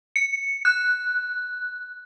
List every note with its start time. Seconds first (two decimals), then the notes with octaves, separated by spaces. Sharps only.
0.16 C#7
0.65 F#6